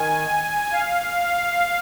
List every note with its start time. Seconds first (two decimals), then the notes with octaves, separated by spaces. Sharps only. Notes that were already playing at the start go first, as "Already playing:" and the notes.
Already playing: D#3 G#5
0.73 F5